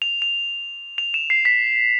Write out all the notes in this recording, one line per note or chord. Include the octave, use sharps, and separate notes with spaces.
F7
F7
F7
E7
C7
B6